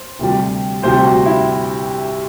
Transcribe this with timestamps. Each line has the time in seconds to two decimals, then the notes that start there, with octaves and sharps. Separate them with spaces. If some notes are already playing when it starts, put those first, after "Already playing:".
Already playing: C5
0.19 D2 C3 G3
0.82 D2 C3 G3 C5
1.05 F#4
1.26 E4